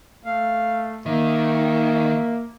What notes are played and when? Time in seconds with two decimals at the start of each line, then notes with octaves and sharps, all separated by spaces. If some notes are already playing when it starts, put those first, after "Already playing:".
0.25 A3 F5
1.06 D#3 A#3 E5